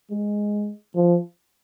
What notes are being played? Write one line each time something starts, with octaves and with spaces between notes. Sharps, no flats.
G#3
F3